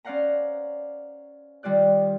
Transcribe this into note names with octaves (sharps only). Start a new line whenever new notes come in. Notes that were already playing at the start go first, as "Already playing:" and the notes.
C#4 C5 D5 F5 F#5 A#5
D#3 G3 F4 D5 F#6